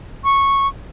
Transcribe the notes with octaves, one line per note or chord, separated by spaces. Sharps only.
C#6